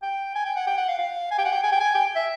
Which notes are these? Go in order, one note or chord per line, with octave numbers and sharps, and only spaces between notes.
G5
G#5
G5
F#5
G5
F#5
F5
F5
G#5
G5
F#5
G5
G#5
G5
G#5
G5
E5